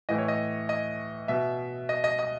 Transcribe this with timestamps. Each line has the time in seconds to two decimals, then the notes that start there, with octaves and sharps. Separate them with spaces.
0.09 A2 E3 D#5
0.18 C#5
0.28 D#5
0.69 D#5
1.28 B2 E5
1.89 D#5
2.04 D#5
2.19 D#5